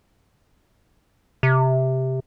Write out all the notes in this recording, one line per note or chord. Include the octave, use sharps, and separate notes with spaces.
C3